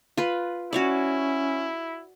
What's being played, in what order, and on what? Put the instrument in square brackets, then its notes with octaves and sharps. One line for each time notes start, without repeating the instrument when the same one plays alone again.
[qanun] F4 B4
[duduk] C#4 [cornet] E4 [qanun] F#4 C#5 D5